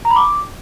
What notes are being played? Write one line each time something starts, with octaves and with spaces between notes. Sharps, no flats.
A#5
B5
D6